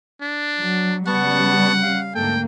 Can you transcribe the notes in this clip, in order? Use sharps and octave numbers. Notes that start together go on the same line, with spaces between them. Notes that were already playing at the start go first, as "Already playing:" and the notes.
D4
F#3
C#3 G3 B3 F#5 A5 C#6
F5
D2 G#2 A#3 A4 G5